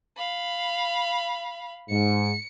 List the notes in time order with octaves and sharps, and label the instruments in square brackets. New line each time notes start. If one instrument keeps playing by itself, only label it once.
[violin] F5 B5
[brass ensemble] G#2 [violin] C#7